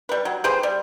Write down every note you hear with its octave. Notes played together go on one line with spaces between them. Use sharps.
G3 B4
F#3
G4 G#4 B4 C5
G3